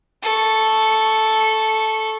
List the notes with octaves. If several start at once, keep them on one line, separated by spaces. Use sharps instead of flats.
A4 C#6